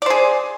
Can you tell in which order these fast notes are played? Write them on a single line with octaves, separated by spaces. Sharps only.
D5 C5 G#4